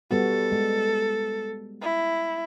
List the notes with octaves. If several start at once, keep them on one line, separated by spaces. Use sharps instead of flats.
G3 B3 F#4 A4
G#3
E4